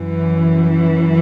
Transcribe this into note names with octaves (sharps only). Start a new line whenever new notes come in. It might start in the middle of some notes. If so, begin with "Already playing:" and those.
Already playing: F#2 E3